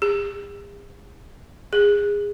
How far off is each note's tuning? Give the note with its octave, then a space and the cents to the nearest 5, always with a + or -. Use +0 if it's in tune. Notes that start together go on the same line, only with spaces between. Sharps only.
G#4 -45
G#4 -20